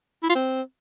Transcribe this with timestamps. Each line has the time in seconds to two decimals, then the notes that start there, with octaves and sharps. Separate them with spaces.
0.23 E4
0.29 F4
0.35 C4